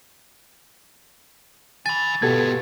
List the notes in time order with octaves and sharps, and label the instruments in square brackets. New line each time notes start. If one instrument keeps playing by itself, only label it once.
[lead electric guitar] G#5 B5 [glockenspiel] A6
[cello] B2 [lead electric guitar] B3 F4 [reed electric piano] G4 A4 G#6